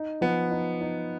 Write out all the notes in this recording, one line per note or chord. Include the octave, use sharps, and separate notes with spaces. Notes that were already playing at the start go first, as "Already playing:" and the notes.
Already playing: D#4
F3 B3
D#4
D#4